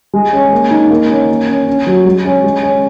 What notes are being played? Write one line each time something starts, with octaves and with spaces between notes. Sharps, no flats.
G#3
C#4
A#3
D#4
A#3
C#4
A#3
C#4
C#4
F#3
G#3
C#4
G#3
C#4